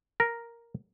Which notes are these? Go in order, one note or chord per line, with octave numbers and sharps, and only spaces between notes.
A#4